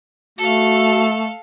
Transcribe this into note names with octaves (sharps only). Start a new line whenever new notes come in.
A3 F#4 A4 F5